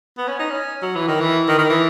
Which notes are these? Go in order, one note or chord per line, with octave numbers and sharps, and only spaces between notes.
B3
C#4
D#4
C#4
F#3
E3
D#3
E3
D#3
D#3
E3